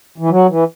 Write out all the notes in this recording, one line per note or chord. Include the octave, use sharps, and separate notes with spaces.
E3
F#3
E3